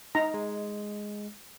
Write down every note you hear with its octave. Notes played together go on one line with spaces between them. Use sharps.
D#4 A#5
G#3